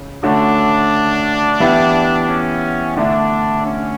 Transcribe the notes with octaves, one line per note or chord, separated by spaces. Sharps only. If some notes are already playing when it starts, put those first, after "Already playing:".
Already playing: C#3
D3 A3 C#4 D4 F#4
E3 B3 E4 G4
C#4
D3 A3 D4 E4
C#4